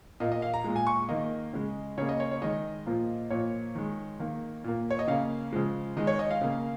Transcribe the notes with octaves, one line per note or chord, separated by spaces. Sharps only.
A#2 A#3 D#5
D#5
F5
A#5
A#2 G#3
G#5
C#6
D#3 A#3 D#5
C#3 G#3
C#3 A#3 C#5
D#5
C#5
C#5
D#3 G#3 D#5
A#2 F3 A#3
A#2 F3 A#3 C#5
D#3 G#3
D#3 A#3
A#2 A#3
C#5
D#5
C#3 A#3 F5
C#3 F3 G#3
D#3 G#3 D#5
C#5
D#5
F5
C#3 A#3